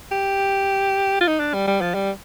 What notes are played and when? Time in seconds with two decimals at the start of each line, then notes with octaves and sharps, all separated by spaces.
0.12 G4
1.21 F4
1.27 D#4
1.40 D4
1.54 G3
1.68 G3
1.81 F3
1.94 G3